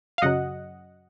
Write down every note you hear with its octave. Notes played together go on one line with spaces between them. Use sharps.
F5
F#2 C#3 F#3 D#5 F#5